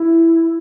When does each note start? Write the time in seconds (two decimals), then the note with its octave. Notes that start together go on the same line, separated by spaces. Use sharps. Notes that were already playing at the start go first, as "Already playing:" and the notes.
Already playing: E4